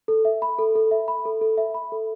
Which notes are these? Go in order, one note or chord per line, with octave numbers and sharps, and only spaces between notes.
A4
E5
B5
A4
A4
E5
B5
A4
A4
E5
B5
A4